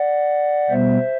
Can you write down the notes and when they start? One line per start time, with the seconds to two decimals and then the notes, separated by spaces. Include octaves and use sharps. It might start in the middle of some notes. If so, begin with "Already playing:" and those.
Already playing: D5 F#5
0.70 B2 G3 B3 C5 E5